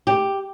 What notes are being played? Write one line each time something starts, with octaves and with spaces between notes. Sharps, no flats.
G4